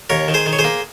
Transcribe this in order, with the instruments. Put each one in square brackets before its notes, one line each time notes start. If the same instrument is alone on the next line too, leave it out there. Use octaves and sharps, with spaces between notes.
[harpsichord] D#2 A#4 C#5
D#3
G#4 C5
D#3
C#5
G#4 C5
A#3